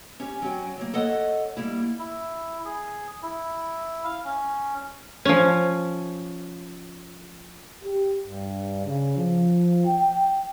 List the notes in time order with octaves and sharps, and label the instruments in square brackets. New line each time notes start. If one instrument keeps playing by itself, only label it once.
[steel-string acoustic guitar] C#4 G4
F#3 C#4 G5
F#3 A#3
A4 C#5 D#5 F#5
G3 A#3 E4
[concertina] E4
G#4
E4
F5
C#4
[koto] F3 C#4
[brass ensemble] G4
G2
C#3
F3
G5